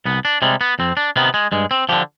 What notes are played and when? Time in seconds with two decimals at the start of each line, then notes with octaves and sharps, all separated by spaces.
0.05 C2 B3
0.25 D4
0.42 C3 G3 G#3
0.61 B3
0.79 F2 C4
0.97 D4
1.16 C3 D#3 B3
1.34 G#3
1.52 G2 G#3
1.71 C4
1.89 D3 F3 G4